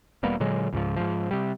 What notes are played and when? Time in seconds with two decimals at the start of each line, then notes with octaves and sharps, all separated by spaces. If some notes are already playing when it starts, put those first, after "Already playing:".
0.23 E1 G3 A#3 B3
0.40 A#2 D3 F#3 G#3
0.73 C#2 G#2 F3
0.96 G#2 F3
1.31 C3 G3